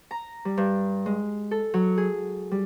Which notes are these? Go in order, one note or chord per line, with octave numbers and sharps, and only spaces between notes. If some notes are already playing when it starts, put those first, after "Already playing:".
A#5
G3
G2
G#3
A4
F#3
G#4
G3